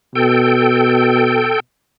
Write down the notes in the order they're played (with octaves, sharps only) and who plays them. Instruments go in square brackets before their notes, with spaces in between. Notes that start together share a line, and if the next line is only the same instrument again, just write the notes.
[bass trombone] B2 [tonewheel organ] A4 G5